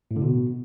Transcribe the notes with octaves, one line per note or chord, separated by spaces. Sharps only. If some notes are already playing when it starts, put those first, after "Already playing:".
A2
D3
B2